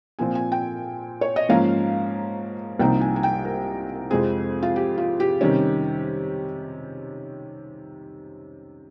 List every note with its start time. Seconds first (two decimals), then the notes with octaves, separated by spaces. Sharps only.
0.19 A#2 F3 C4 G#5
0.35 G#5
0.52 G5
1.21 C#5
1.36 D#5
1.49 G#2 F3 A#3 C#4 F5
2.79 C2 C3 F3 A#3 D#4 G5
3.01 G#5
3.16 G#5
3.23 G5
3.45 A#4
4.10 F2 C3 F3 G#3 C4 G#4
4.63 F4
4.76 G4
4.98 F4
5.20 G4
5.41 C3 D#3 G3 C#4